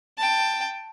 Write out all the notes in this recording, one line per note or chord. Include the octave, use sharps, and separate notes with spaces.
G5 A5